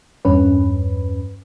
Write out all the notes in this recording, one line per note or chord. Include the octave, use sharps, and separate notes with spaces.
E2 G2 C#4 B4